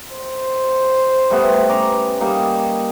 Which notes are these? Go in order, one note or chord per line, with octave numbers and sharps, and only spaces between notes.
C5
G3 A3 B3
C#4 A#5 D6
G3 A#3 D#4